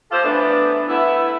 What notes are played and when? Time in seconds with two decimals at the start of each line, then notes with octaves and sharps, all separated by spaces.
0.11 F3 F4 G4 A4 C5
0.24 E3 A3 B3 D4
0.89 A3 B3 E4